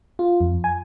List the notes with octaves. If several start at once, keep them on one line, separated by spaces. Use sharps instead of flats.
F4
F2
G#5